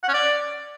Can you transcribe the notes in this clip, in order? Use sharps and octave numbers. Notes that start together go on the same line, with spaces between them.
F#5
C#4
D5